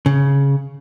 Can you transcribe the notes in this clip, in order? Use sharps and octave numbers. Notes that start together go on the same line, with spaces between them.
C#3